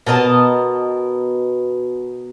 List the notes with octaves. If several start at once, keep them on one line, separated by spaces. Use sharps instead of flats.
B2 A#4 D#5 A5